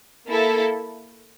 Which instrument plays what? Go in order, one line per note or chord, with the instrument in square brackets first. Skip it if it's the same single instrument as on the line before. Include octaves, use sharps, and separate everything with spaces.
[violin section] A#3 E4 A4